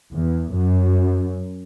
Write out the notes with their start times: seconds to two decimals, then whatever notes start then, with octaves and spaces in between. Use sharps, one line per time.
0.13 E2
0.53 F#2